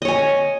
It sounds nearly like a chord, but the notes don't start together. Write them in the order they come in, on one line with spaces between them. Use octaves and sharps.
D#5 C#5 G#5